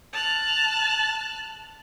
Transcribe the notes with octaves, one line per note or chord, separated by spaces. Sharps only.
A5 F6 F#6